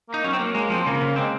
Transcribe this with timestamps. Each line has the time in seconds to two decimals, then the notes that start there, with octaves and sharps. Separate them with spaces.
0.09 A#3
0.14 D#4
0.24 F#3 C#4
0.33 C4
0.39 A#3
0.55 G#3 A#3
0.70 F3 C4
0.86 C#3 A#3
1.01 C#3
1.16 G#3 C4